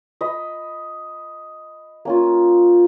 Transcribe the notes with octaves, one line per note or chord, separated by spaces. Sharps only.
D#5 B5
A#3 C#4 F4